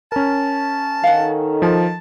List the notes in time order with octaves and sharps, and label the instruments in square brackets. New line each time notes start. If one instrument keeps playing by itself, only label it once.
[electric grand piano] C#4 A#4 [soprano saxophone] A5
[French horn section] D#3 D#4 A4 [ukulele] F5 F#5
[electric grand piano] F3 [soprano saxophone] A5